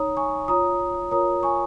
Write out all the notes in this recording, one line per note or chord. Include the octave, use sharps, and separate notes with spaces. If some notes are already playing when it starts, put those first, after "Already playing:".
Already playing: D#4 C#5 A#5 D#6
G#5 C#6
F4 C#5 A#5 D#6
F4 A#4 C#5 A#5 D#6
G#5 C#6